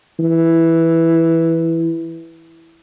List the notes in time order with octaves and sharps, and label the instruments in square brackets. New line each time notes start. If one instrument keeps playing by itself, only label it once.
[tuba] E3